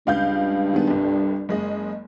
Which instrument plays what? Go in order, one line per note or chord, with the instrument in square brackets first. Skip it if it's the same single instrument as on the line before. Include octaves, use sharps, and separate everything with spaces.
[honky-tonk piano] C#2 F5 G6 [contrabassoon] G2
[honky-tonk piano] D#3 G#3 B3
G1 C2
F#1 G#3 D#5